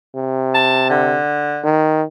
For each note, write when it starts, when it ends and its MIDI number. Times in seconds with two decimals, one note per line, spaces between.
0.15 1.17 48
0.55 0.87 81
0.89 1.65 50
1.64 2.03 51